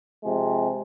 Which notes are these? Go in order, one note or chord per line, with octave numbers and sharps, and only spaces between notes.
C3 F3 G#3